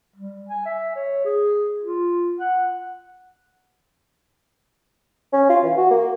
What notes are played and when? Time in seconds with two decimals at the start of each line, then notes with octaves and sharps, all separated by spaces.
0.16 G3
0.49 G#5
0.66 E5
0.96 C#5
1.25 G#4
1.83 F4
2.40 F#5
5.33 C#4
5.49 F4
5.64 E3
5.77 F#4
5.91 A#3